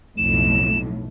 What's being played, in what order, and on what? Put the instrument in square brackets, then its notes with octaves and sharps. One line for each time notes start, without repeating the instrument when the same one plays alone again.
[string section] B1 F2 A2 [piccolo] E7